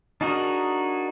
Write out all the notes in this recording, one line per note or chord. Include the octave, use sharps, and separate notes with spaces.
D4 D#4 F#4 G#4 A#4